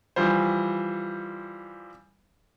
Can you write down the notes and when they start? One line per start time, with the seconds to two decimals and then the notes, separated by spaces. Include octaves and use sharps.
0.16 E3 F3 G3 C5